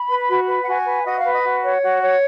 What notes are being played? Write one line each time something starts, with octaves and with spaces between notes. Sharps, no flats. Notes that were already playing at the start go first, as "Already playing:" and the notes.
Already playing: B5
B4
F#4
B4
F#5
F#4 G#5
B4
F#4 D#5
F5
B4
D#5
F#4
C#5
F#4
C#5